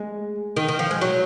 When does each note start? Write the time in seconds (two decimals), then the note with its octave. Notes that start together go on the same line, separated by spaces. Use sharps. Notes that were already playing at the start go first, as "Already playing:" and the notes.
Already playing: G#3
0.56 D#3
0.68 D#3
0.79 F3
0.91 G#3
1.01 F#3